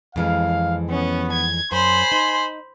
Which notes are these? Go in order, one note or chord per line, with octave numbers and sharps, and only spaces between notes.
F2 E3 G#3 F5
B3 C#4
G#6
F#2 C5 G#5 B5 C6
D#4